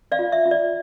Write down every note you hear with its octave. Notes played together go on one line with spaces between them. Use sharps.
D5 F5
F4
E5
F4
D5